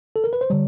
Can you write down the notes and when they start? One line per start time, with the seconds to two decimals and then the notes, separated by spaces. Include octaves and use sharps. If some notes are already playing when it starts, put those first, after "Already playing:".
0.16 A4
0.24 A#4
0.33 B4
0.41 C5
0.50 D3 G3 C#5